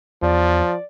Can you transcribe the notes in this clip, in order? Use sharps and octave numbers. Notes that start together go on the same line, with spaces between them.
E2 F3 D5